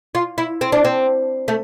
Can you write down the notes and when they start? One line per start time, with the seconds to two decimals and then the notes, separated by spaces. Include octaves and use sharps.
0.15 F4
0.38 E4
0.61 C4
0.72 D4
0.85 C4
1.48 A3